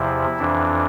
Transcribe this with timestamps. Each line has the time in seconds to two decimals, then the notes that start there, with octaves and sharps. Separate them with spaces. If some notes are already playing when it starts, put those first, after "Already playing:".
Already playing: E2 C3 F3 E4
0.39 F2 E3 D4